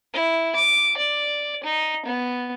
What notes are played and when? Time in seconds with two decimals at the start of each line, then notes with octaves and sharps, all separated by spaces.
0.13 E4
0.56 D6
0.97 D5
1.64 D#4
2.06 B3